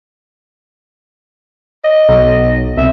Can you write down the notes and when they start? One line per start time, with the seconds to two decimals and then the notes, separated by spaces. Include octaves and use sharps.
1.84 D#5
2.09 B1
2.77 C2 E5